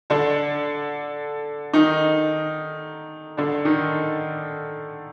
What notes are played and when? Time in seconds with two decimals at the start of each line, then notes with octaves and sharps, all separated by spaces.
0.10 D3 D4
1.73 D#3 D#4
3.37 D3 D4
3.65 D#3 D#4